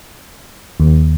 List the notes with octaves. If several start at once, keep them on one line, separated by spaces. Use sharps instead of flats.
D#2